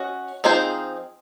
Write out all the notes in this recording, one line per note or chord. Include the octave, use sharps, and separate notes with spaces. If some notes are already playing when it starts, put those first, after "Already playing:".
Already playing: C#4 F#4 D#5
F3 C4 D#4 G#4 C5